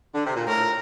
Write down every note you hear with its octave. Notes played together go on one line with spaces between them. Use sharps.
D3
C3
A#2
A2 A#4